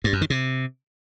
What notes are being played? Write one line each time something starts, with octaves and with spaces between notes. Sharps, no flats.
G2
F#2
D#3
C3